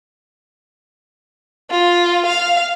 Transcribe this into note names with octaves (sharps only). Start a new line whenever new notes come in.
F4
F5